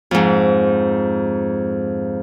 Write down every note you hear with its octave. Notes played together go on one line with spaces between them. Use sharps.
F2 G#2